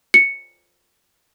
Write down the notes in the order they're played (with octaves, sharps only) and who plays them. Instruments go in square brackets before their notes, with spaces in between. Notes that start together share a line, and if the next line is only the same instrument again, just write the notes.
[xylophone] C#7